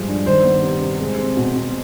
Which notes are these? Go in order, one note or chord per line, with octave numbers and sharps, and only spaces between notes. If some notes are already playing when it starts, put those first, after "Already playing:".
Already playing: G2 F3 G#3 C5
D4
D#3 C5
B3
C3
C3
G#3
C4
B2
B2